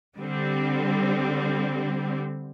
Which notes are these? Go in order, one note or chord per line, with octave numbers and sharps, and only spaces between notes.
D3 G3 C4